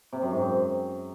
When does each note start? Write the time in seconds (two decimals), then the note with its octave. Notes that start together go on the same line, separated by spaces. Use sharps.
0.13 C3
0.22 F#2
0.31 G#2
0.41 F#2